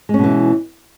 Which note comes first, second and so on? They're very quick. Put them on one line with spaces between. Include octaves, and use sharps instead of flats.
G#3 C#4 B2 E3